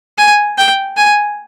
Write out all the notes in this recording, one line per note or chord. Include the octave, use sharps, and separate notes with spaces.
G#5
G5
G#5